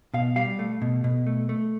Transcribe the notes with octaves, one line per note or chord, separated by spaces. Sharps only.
B2 F5
G3 F5
A3
B2
B2
A3
A3